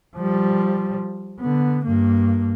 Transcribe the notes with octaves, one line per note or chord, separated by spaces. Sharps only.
F3 G3
D3 B3
G2 A#3